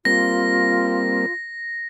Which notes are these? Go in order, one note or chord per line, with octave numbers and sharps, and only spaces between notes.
G3 A#3 C4 F4 A#6